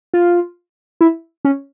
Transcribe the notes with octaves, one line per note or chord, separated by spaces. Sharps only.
F4
E4
C#4